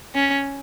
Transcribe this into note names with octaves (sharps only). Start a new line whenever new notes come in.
C#4